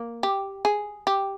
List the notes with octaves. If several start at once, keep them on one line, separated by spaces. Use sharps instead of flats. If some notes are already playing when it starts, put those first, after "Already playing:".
Already playing: A#3
G4
G#4
G4